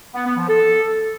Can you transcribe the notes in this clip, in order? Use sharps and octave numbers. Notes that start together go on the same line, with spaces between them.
B3
B3
F3
A4